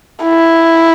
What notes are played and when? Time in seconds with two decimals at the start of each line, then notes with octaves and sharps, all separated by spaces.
0.24 E4